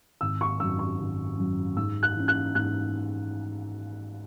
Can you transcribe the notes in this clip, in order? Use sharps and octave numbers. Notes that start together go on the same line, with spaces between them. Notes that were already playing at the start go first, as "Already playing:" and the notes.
G#1 E6
C#6
F#2 F#3 E6
C#6
G#1
F#2 F#3
G#2 E6
F#6
E3 C#4
F#6
G#2 F#6